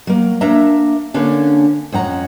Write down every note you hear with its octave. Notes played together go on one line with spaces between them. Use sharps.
F#3 A#3
A#3 D4 E5 A#5
D3 A#3 C#4 D4
F2 C#4 F#5 A#5